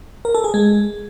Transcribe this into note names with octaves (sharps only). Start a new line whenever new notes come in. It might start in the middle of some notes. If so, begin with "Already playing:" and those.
A#4
A4
G#4
G#3